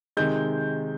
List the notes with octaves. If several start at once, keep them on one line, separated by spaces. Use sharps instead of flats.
C3 D#3 G#3 G6